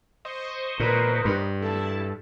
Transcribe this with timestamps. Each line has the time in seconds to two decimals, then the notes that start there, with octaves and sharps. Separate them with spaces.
0.25 C5 D#5 C#6
0.80 A#2 A#4 B4
1.25 G2
1.62 E4 A4 A5